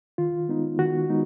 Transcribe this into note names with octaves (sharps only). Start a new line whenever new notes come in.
D#3 F4
G#3 B3 D#4
D#3 F#4
G#3 B3 D#4